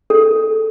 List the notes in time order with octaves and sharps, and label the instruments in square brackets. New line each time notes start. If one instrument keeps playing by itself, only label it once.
[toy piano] A4